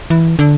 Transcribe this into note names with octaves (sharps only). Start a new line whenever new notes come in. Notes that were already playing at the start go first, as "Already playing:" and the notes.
E3
D3